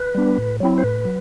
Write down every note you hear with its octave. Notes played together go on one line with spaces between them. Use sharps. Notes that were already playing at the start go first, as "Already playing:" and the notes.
Already playing: B4
G3 B3 D4
A2
F#3 C4 E4
C5
A2 B4
F#3